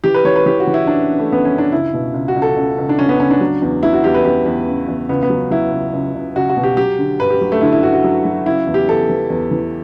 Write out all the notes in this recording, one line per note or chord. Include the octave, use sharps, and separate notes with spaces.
E3 G4
B4
E3 C#5
B4
E3 G4
F#4
E3
E4
F#2 D4
F#2
A3
F#2 B3
C#4
F#2
D4
C#2 E4
B2
C#2
F#4
C#2
A4
C#2
C#2
D4
C#2 C#4
B3
C#2 C#4
D4
F#3
E2
F#3 E4
F#4
E2 G4
B4
E2 G4
E2
C#3
E2
C#2 B3
B3
F#3
F#3 E4
C#2
C#2
C#2
C#2 F#4
F#4
B2
G4
F#3 G4
D3
G2 B4
G4
F#3
A3
D3 E4
E4
G2 F#4
F#4
F#3
F#3
C#3 E4
E2
G4
E2 A4
E3
E2
E3